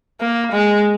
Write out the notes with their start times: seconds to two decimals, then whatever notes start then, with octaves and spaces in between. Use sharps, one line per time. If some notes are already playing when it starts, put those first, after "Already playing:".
0.21 A#3
0.52 G#3